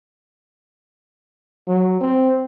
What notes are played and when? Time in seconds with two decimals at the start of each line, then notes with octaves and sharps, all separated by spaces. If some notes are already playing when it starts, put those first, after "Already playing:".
1.67 F#3
2.01 C4